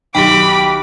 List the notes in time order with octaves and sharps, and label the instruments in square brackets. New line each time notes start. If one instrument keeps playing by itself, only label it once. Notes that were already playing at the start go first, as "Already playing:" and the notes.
[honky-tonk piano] B1 D#3 [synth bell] G4 G5 [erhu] B5 [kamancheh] D6